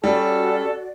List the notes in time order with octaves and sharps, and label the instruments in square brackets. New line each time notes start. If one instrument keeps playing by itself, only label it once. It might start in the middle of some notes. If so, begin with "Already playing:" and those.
[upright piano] G3 [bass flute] C#4 [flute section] F#4 D5 [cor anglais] A4